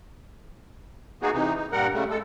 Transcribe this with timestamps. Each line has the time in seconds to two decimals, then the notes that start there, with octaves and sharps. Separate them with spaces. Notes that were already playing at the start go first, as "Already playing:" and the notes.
1.22 A#3 B3 D#4 F#4 G#4
1.34 C3 E3 D#4
1.57 D#4
1.72 G2 A#2 G3 A#4 F#5
1.94 C#3 G3 A3
2.10 G#3 A4